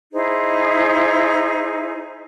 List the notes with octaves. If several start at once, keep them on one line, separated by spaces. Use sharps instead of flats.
D#4 E4 G#4 C5